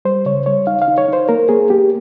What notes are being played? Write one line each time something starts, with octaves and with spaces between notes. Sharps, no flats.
G3 C5
C#3 C#5
G3 C#5
D#4 F5
F5
D#4
C#5
D#4 C5
A#3 A#4
A#3 G#4
A#3 G4